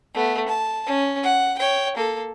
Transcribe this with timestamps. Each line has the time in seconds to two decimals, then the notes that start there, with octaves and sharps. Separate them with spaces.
0.14 A3 B3
0.48 A5
0.86 C#4
1.23 F#5
1.58 C#5 G5
1.97 A#3 A4